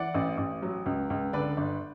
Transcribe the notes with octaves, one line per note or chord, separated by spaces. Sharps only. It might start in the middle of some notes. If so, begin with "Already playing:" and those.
Already playing: E3 D5 F#5
A1
A1
F#3
C#2
C#2
D3 B4 D5
G1